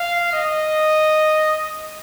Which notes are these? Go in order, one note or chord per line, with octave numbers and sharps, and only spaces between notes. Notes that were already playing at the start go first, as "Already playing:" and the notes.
Already playing: F5
D#5